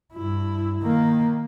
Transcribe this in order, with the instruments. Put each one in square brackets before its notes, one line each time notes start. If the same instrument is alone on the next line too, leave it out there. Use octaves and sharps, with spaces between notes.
[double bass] G2 E4
D#3 A#3